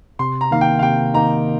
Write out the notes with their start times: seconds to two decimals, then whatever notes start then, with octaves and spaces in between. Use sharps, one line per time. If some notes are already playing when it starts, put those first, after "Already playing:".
0.19 C3 C6
0.41 A#5
0.51 D#3 A#3 D#4 F5
0.61 G5
0.79 F5
0.82 C3 G5
1.14 D#3 A#3 D#4 A#5